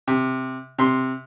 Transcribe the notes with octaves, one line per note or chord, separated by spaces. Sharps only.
C3
C3 C6